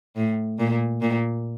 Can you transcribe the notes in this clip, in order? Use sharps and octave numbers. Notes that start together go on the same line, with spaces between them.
A2
A#2
A#2